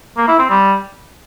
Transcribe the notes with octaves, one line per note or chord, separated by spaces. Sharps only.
A#3
E4
C4
G3